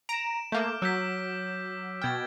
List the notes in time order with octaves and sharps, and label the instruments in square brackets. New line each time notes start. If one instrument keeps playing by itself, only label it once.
[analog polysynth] A#5 [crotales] D7 E7
[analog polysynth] A3 A#3 [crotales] D6 F6 G6
[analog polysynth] F#3 [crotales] E6 G6 B6
[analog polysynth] B2 G5 [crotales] F6 G#6 A6